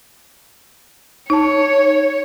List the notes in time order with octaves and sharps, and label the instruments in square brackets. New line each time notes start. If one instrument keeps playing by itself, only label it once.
[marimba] D#4 A5 [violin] C#5